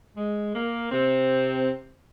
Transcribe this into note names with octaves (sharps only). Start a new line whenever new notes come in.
G#3
A#3
C3 C4